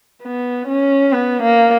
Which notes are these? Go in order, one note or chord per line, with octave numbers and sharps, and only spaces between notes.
B3
C#4
B3
A#3